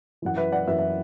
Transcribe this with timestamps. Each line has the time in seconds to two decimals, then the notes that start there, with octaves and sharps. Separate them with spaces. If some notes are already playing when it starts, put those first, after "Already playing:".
0.22 F#2 E3 F#5
0.37 B4 E5
0.52 D5 F#5
0.67 F#2 E3 B4 E5
0.79 E5